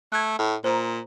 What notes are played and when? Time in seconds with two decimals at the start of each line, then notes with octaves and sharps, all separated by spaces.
0.12 A3 F#6 G#6
0.38 A2
0.64 A#2 C5 A#5